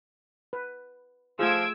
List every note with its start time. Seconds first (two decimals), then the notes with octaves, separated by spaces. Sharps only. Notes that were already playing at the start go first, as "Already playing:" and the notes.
0.53 B4
1.39 F3 A3 F4 G#4 E6 G#6 D7